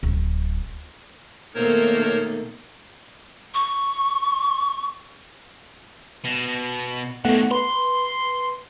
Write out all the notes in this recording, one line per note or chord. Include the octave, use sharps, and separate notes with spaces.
D1
B2 D#3 A3 A#3 D#4 A#4 C5 C#5
C#6
B2
A2 D#3 A3 B3 F#5
B4 C6